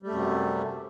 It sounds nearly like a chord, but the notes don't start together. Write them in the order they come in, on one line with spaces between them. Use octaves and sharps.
G3 A3 F#2 C3